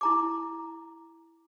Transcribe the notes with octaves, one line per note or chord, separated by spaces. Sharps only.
E4 A#5 D6